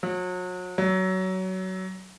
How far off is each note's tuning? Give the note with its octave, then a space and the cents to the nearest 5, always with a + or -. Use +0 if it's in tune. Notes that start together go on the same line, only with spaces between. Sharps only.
F#3 -35
F#3 +20